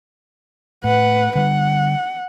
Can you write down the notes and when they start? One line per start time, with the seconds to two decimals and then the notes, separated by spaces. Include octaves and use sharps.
0.84 A2 B4 F#5
1.35 D3 G3 F#5